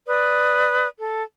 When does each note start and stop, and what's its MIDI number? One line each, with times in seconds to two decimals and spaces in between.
0.06 0.87 71
0.06 0.87 74
0.06 0.87 87
0.98 1.22 69